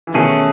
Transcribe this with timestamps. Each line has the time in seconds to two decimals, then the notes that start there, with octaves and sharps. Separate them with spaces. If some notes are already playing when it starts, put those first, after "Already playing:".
0.07 E3
0.14 B2 D#3 A3 C#4 G#4